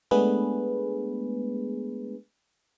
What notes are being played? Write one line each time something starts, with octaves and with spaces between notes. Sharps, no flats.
G#3 A3 B3 D4 G#4 B4